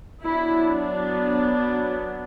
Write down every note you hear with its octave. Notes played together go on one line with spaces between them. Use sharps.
F#3 B3 D4 E4